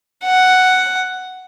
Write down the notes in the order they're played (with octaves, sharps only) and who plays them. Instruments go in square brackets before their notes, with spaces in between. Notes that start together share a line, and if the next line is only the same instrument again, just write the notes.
[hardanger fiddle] F#5